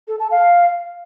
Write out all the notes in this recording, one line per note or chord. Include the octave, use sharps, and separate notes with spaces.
A4
A5
F5